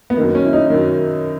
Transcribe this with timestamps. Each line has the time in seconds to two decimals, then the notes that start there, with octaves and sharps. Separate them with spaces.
0.10 B3
0.17 F#2 D#3 A#3
0.35 C#4
0.44 E4
0.53 D#4
0.70 F#2 D#3